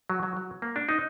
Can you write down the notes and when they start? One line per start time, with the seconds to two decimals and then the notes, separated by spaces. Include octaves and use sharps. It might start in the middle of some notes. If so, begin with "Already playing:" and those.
0.10 F#3
0.23 F#3
0.37 F#3
0.62 A#3
0.76 D4
0.89 D#4